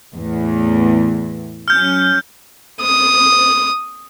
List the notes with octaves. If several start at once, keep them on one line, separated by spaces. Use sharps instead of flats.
E2 A2
F#3 C#4 F6 G6
D#6